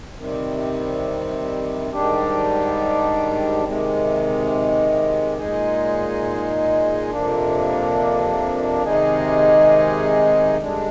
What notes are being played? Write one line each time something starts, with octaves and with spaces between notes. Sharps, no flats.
C3 D#3 G3 C4
G#2 D#3 G3 D4 G4
C3 D#3 G#3
A#2 G#3 D#4 G#4
F2 C3 F3 A#3 D4
C3 D#3 G#3 D#4 G#4
G2 D3 G#3 D4